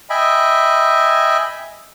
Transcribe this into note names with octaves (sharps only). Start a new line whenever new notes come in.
D#5 E5 G5 G#5 B5